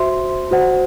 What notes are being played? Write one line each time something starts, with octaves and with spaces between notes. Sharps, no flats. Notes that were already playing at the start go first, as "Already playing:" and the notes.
Already playing: F#4 C5 E5 C6
F#4 C5 F#5